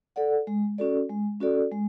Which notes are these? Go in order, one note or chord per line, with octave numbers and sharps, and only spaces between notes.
A4 D5 F#5
G#3
C#4 F#4 A4 D5
G#3
C#4 F#4 A4 D5
G#3